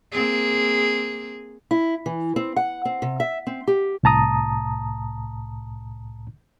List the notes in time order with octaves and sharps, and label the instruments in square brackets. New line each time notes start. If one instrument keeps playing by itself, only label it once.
[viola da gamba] A#3 C4 G#4
[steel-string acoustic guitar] E4
E3
C4
F#5
C4
C3
E5
C4
G4
[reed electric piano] C2 A2 A5 A#5 D#6